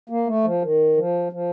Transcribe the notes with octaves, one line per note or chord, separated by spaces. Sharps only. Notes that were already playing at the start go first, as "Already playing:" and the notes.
A#3
A3
F3
D#3
F3
F3